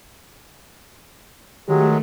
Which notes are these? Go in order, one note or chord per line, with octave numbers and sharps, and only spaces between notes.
D#3 F#3 G#3 A3 G4